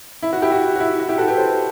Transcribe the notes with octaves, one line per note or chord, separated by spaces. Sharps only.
E4
F#4
E4 G4
F#4
F#4
E4
F#4
E4 G4
F#4 A4
G4 B4
A4 C5